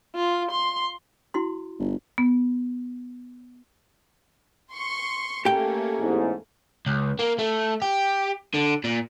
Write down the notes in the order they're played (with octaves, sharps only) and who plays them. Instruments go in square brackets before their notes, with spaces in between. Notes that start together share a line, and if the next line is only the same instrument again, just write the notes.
[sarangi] F4
C6
[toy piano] E4 F#4 C6
[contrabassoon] G1
[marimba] B3
[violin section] C6 C#6
[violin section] A3 A#3 C#4 [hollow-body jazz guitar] G4 G5
[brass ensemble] A1 E2 G#2
[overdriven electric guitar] C#2
A#3
A3
G4
D3
A#2